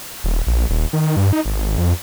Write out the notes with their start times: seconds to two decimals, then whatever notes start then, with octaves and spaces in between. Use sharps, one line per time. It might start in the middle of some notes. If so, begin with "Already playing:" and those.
0.24 D#1
0.47 A#1
0.70 D#1
0.93 D#3
1.16 G2
1.33 D#4
1.45 G#1
1.78 F2